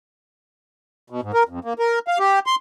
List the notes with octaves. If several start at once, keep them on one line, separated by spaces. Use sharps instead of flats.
B2
G#2
A#4
F2
A#3
A#4
F5
G4
C6